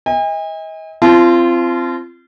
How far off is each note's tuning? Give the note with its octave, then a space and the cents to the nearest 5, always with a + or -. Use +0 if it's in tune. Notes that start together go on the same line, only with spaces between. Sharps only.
D#5 +40 G#5 -45
C4 +0 F4 -30 A5 -30